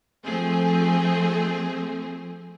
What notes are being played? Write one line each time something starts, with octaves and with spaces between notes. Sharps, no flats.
F3 A3 C4 G#4